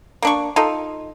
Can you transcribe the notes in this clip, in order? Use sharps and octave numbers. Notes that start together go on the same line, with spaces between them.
A#3 D4 C#6
D#4 F4 A4